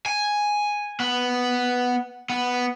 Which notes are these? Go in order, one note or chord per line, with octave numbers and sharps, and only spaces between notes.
G#5
B3
B3